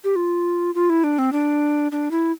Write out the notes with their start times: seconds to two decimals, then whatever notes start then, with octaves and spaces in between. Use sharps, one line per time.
0.04 G4
0.16 F4
0.75 F4
0.90 E4
1.04 D4
1.18 C4
1.32 D4
1.92 D4
2.11 E4